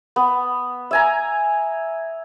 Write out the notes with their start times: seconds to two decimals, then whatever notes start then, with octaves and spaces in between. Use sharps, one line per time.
0.16 B3
0.91 E5 G#5 A#5